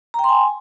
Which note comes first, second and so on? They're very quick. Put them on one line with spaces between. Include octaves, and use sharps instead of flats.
A#5 G5 C6 G#5